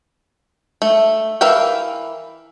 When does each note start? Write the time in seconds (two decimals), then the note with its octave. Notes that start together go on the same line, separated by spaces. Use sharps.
0.82 A3
1.41 E3 A#4 E5 F5 G5